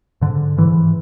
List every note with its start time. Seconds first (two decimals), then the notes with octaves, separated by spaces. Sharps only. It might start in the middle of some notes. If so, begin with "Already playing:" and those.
0.21 G#2 D3
0.58 G#2 E3